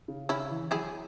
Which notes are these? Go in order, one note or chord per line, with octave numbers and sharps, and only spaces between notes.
C#3
C#3 C#4 E4
E3
F#3 E4 G#4